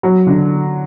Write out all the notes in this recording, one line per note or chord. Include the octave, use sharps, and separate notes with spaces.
F#3
D3